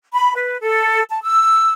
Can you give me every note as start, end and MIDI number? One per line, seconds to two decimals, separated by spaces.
0.13 0.33 83
0.36 0.58 71
0.61 1.02 69
1.10 1.19 81
1.24 1.73 88